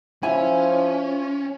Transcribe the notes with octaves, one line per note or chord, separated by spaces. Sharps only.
F3 C#4 E4 G#5